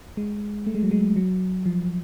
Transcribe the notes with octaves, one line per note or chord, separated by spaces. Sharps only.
G#3
A3
G#3
F#3
G#3
F#3
F3